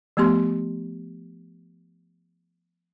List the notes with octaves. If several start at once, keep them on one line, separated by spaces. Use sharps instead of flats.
F3 A3 B3 G4 C6